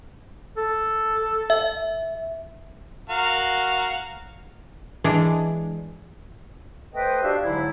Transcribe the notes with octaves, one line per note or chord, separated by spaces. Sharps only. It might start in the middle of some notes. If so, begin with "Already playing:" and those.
A4
E5
F#4 A#4 F5
E3 G#3 D4
A3 B4 C5 D#5 G5
D4 F#4 G4 E5 F5
G#2 D3 F#3 E4